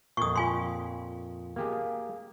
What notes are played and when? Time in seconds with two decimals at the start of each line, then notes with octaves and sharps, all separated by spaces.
0.17 F2 A#2 C#6 D#6
0.36 F4 G#5 C6
1.56 A#3 G4 G#4